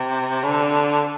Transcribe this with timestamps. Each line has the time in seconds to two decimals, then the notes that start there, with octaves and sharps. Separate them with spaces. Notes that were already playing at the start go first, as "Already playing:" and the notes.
Already playing: C3
0.43 D3